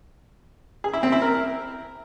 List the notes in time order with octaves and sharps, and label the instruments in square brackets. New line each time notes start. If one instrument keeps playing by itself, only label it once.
[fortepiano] G#4
E4
C4
E4
A#4